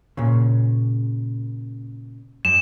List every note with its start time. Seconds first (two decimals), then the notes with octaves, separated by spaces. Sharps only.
0.17 A#2 C#3
2.45 F#2 E7